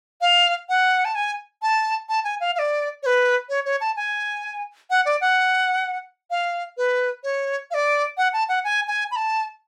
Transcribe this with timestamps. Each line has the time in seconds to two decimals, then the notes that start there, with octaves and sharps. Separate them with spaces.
0.21 F5
0.69 F#5
1.05 A5
1.15 G#5
1.62 A5
2.09 A5
2.24 G#5
2.40 F5
2.55 F5
2.59 D5
3.03 C#5
3.06 B4
3.49 C#5
3.65 C#5
3.81 A5
3.96 G#5
4.90 F#5
5.06 D5
5.21 F#5
6.30 F5
6.77 B4
7.24 C#5
7.71 F5
7.74 D5
8.18 F#5
8.33 A5
8.49 F#5
8.64 G#5
8.88 G#5
9.11 B5
9.16 A5